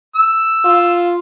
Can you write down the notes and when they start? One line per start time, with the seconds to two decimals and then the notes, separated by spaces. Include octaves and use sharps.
0.16 E6
0.65 F4